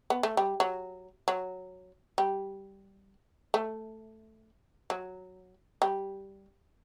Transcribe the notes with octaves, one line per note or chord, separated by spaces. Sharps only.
B3
A3
G3
F#3
F#3
G3
A3
F#3
G3